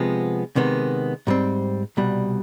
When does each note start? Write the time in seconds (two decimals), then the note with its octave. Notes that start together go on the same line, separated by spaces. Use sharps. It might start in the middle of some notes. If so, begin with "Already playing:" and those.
Already playing: C3 F3 G#3 B3
0.56 C3 D#3 G#3 B3
1.27 G#2 G3 C4
1.97 C2 B2 G3